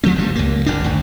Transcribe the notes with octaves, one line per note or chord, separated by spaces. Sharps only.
A#2 F3 A3 C4
F#1 G#2 G3
C#2 A#3
G1 F#2 D4
G#1 D2